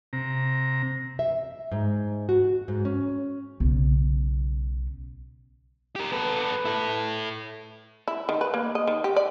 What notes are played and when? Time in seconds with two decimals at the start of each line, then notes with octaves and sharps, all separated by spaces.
0.13 C3 A#5
1.19 E5
1.72 G#2
2.29 F#4
2.68 G#2
2.85 C#4
3.60 B1 C#3
5.96 G4 A#4
6.12 B3 A4 B4
6.65 E4 A4
8.08 E4
8.29 D#3
8.41 B4
8.54 A#3
8.75 D#5
8.87 D#3
9.04 G4
9.16 D5